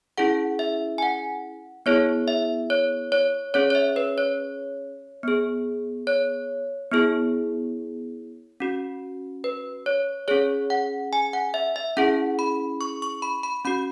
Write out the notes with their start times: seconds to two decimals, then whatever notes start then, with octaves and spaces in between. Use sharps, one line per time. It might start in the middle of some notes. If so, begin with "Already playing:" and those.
0.18 C#4 E4 G#4 F#5
0.59 E5
0.98 G#5
1.02 F#5
1.86 B3 E4 G#4 C#5
2.28 E5
2.70 C#5
3.12 C#5
3.54 C#4 G#4 C#5
3.70 C#5
3.75 E5
3.96 B4
4.18 C#5
5.23 B3 G#4
6.07 C#5
6.91 B3 E4 G#4
8.60 C#4 F#4
9.44 B4
9.86 C#5
10.28 C#4 G#4 C#5
10.70 F#5
11.13 G#5
11.33 F#5
11.54 E5
11.76 E5
11.97 C#4 E4 G#4 F#5
12.39 B5
12.81 C#6
13.02 C#6
13.22 B5
13.43 B5
13.65 C#4 F#4 B5